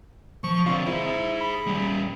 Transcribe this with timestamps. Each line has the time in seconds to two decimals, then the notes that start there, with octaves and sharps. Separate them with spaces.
0.44 F3 C#6
0.66 D3 C4 F4
0.86 E4 G#4 C5
1.41 B5
1.66 G3 C#4